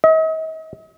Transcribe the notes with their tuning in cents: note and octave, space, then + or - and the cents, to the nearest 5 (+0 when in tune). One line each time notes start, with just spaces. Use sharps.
D#5 +45